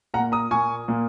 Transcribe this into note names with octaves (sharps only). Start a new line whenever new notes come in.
A#2 F#5 A#5
A#3
A#5 D#6
A#2 A#3 G#5 C#6
A#2 A#3